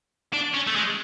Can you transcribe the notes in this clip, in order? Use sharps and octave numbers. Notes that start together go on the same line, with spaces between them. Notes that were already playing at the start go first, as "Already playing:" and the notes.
D4
C#4
A3
G#3